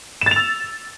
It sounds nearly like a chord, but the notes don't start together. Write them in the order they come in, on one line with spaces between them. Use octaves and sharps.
E7 A6 F7 E6